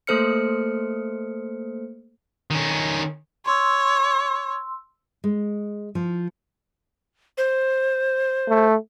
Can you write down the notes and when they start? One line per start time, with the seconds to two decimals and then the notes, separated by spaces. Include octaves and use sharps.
0.07 A3 A#3 A4 C5 F6 C#7
2.51 D#3 C#4
3.46 C#5 C6 E6
5.24 G#3
5.95 F3
7.38 C5
8.49 A3